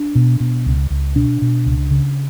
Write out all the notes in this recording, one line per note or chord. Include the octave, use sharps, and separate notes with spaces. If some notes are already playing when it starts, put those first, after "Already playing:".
Already playing: D4
B2
B2
C#2
C#2
B2 D4
B2
C#2
C#3